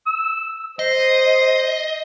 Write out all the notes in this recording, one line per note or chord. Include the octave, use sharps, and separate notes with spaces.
E6
C5 D#5